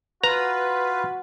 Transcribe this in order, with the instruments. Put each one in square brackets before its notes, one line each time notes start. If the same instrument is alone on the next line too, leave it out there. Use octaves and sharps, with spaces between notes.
[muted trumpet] F4 [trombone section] F#4 [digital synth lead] B4 [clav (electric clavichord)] A#5